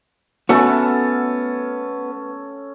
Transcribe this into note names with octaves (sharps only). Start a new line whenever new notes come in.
A3 B3 C#4 F#4 A4